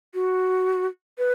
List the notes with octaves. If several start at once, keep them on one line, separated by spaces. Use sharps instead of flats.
F#4
B4